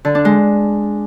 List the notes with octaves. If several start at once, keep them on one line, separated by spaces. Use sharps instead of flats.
D3
D4
G#3